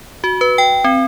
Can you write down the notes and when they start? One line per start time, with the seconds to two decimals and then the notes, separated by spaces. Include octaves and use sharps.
0.24 F#4
0.41 B4
0.58 G5
0.84 C4